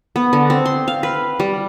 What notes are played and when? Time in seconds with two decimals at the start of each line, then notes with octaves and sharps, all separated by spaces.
0.16 B3
0.33 D3
0.50 C4
0.65 C6
0.88 F5
1.03 B4
1.40 G3